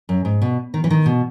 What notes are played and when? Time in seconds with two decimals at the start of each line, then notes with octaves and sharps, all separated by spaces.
0.09 F#2
0.25 G#2
0.42 B2
0.74 D#3
0.84 E3
0.90 D#3
1.06 B2